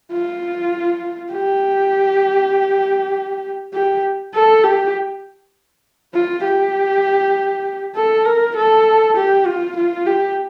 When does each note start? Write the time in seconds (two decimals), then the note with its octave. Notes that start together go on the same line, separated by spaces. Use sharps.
0.12 F4
1.33 G4
3.74 G4
4.34 A4
4.64 G4
6.14 F4
6.44 G4
7.95 A4
8.25 A#4
8.56 A4
9.16 G4
9.46 F4
9.77 F4
10.06 G4